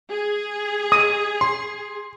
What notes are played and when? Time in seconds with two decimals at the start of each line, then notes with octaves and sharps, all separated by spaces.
0.10 G#4
0.92 D#6
1.41 C6